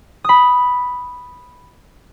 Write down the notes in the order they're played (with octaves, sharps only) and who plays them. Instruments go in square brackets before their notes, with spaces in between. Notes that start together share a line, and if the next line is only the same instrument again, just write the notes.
[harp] B5 D#6